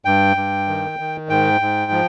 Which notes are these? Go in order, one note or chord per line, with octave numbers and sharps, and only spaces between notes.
G2 G5
G2
D#3
D#3
G#2 G5
G#2
F3